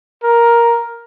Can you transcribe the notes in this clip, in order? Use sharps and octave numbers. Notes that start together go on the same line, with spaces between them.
A#4